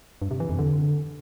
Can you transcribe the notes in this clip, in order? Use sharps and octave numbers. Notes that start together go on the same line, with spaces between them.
G2
C3
E3
F2
D3